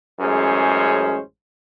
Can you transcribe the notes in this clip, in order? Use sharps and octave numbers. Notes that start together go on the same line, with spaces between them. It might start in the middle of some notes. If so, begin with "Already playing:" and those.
A1 F#2 G#3 C#4 G#4 C5